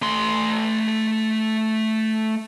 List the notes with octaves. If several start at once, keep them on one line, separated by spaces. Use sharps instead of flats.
A3 C6